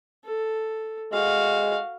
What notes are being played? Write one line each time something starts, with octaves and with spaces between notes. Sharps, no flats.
A4
G#3 F#4 F5